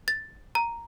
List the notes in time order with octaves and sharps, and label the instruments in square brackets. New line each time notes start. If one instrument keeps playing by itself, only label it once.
[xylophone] A6
A#5